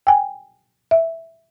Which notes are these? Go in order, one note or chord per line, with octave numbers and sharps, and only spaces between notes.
G5 G#5
E5